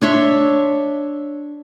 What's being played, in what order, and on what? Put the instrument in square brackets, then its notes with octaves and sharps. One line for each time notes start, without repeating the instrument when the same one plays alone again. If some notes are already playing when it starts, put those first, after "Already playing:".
[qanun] D4 C#5 E5 C6